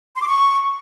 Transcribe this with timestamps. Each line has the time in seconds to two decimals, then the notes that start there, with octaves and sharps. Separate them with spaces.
0.16 C6
0.21 D6
0.26 C#6